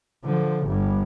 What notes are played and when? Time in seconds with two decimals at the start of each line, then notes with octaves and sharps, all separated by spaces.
0.25 D3 F3
0.67 G1 G2